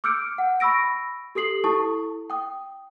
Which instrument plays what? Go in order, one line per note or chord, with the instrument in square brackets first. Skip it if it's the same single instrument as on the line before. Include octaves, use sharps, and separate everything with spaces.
[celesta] D6 E6 F6 G6 C#7 D7
F#5
B5 C#6 E6 A#6 D7
G4 A4 D#6 C7 F#7
E4 A4 A5 C#6 D#6
G5 D#6